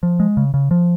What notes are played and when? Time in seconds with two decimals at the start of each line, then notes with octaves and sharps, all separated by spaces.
0.03 F3
0.20 G#3
0.37 C#3
0.54 C#3
0.71 F3